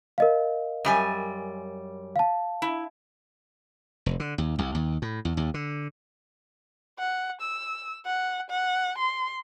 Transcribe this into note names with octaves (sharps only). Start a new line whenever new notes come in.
A#4 D#5 F5
F#2 G3 G#5
F5 A5
E4
F1
D3
D#2
C2
D#2
A2
E2
D#2
D3
F#5
E6
F#5
F#5
C6